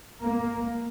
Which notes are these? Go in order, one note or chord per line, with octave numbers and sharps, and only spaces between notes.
A#3